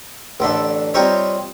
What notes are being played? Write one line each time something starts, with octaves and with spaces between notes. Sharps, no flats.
A1 D3 A3 D4
G3 C4 D#4 F4 C5 C#5